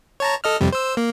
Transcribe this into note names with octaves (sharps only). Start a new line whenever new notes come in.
C#5 A5 A#5
A4 D#5 F6
F2 C3 G3
C5 E6
A#3